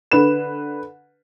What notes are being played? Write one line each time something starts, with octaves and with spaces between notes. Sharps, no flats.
D3 B4 E7